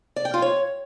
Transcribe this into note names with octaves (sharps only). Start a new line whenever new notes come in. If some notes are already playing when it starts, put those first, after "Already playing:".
D5
G5
F4
C#5